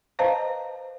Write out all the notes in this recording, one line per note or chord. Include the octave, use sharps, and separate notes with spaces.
B4 C5 D#5 F5 A5 A#5